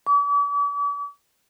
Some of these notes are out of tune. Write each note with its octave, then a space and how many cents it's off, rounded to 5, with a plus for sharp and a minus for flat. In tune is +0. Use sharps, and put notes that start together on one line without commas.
D6 -45